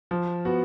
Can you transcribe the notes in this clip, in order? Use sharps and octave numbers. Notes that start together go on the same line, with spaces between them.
F3
B3 F#4